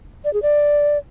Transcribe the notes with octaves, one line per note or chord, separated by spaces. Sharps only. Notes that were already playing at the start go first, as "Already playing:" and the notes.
D5
G#4
D5